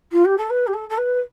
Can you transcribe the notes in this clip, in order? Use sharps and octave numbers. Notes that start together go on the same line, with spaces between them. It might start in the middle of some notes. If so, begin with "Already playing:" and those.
F4
G4
A4
B4
G4
A4
A4
B4